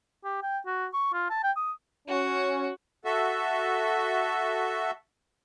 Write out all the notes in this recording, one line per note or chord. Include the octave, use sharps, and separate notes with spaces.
G4
G5
F#4
C#6
F4
A5
G5
D#6
C#4 F#4
F#4 A4 E5